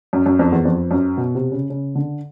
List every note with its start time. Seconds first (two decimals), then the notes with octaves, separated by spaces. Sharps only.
0.13 F#2
0.26 F#2
0.39 F2
0.52 E2
0.65 F2
0.91 F#2
1.17 B2
1.35 C3
1.52 C#3
1.70 C#3
1.95 D3